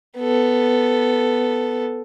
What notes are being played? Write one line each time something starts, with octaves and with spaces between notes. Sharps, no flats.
B3 A4